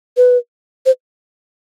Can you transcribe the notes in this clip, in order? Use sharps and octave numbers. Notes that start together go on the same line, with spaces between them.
B4
C5